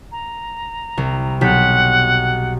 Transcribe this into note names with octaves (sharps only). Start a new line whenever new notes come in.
A#5
C2
B1 G4 F#5 B6